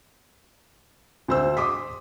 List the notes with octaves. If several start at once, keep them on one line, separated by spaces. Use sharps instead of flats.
D2 C5 E6
C6 D6 D#6 B6